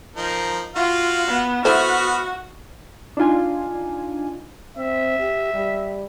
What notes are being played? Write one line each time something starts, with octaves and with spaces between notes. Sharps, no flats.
F3 D#4 A#4
F4 F#4 F5
B3
B3 E4 F#4 A4 C5 B5 F6
D4 D#4 F4 G#5
C4 E5
G4
G3